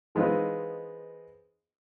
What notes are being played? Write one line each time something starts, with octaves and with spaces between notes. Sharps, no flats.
E3 G#3 B3 C4 D#4 F4